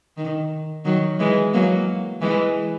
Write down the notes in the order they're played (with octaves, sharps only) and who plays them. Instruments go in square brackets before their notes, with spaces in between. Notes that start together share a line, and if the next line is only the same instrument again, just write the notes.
[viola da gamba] D#3
D#3 F#3
E3 G#3
F#3 A#3
E3 G#3